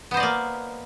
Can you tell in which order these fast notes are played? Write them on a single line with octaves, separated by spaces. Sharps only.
B3 C5 D#5 D5 A#3